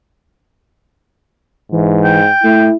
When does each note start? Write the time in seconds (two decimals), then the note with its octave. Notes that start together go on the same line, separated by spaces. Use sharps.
1.72 G#2 E3
2.04 G5
2.44 A3 E4